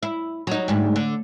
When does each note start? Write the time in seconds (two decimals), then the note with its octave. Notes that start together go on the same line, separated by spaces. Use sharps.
0.03 E4
0.47 F#3 D#4
0.68 D2 G#2 G3
0.96 D3